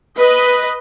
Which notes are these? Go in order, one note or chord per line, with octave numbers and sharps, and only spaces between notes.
B4 D#5